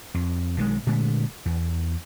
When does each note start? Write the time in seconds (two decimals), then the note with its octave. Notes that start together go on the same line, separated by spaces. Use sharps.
0.14 F2
0.57 B1 D#3 G#3
0.86 A#2 D3 G#3 A3
1.45 E2